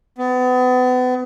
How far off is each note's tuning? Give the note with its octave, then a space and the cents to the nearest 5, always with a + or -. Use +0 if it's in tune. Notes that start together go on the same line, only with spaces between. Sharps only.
B3 +35